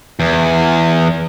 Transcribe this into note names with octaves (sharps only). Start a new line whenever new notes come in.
E2